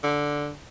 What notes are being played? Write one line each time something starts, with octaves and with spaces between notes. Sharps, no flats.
D3